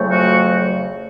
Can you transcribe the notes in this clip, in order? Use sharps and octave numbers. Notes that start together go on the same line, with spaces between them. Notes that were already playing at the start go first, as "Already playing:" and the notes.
Already playing: F2 C#3 F#3 A3
F#4